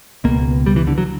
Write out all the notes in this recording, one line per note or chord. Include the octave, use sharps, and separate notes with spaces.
C#2 B2 A#3
G3
E3
D3
F#3